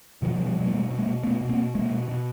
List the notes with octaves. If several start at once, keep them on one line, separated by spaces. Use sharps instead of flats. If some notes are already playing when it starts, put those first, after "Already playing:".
B2 D#3 F3
F3 G3
B2
F3 G3
B2 F#3 G#3
A#3
B2 G3 A3
B2
G#3 A#3
B2
B2 A3 B3
B2
A#3 C4
B2
B2 G#3 A#3
B2
B2